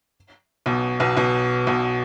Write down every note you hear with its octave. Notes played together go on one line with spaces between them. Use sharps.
B1 B2
B1 B2
B1 B2
B1 B2